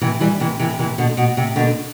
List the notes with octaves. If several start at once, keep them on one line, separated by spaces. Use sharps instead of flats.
C3 E3
E3 G3
C3 E3
C3 E3
C3 E3
B2 D3
B2
C3
B2 D3